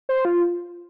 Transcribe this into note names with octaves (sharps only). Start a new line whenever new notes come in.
C5
F4